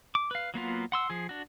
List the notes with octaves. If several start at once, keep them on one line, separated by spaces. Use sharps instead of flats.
D6
B4 F5
F#3 A#3 B3 F4
F#5 C6 E6
F3 G#4
D4 F#4